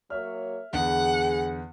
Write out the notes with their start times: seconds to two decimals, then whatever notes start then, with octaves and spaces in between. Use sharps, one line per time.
0.10 F#3 A#3 C#5 E5 F6
0.73 E2 D3 B3 G#4 F#5